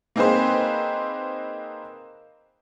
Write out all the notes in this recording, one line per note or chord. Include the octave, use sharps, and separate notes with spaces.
A#3 C4 D#4 G#4 B4 C5